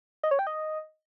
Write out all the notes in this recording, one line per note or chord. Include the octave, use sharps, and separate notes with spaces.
D#5
C#5
G5
D#5